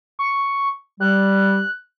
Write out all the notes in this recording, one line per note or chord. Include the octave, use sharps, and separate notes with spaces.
C#6
G3 F#6